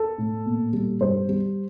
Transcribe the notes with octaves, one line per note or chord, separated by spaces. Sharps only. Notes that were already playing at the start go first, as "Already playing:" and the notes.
Already playing: A4
A2
A#2
G3
G2 C5
G3